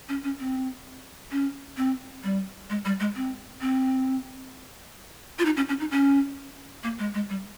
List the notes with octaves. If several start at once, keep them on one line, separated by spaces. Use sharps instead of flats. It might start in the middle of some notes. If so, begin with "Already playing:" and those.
C#4
C#4
C4
C#4
C4
G3
G#3
G3
G#3
C4
C4
F4
D#4
C#4
C#4
D#4
C#4
A#3
G#3
G#3
G3